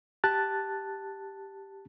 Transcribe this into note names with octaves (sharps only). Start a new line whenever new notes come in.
G4 A5 F#6 A6